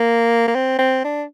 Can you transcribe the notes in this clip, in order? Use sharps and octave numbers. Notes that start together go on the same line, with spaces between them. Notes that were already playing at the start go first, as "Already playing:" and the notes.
Already playing: A#3
A#3
C4
C4
D4